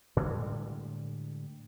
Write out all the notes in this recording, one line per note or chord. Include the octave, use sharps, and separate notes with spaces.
A2 D3 G3 G#3